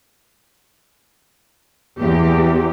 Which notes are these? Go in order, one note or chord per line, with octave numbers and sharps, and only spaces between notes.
E2 G4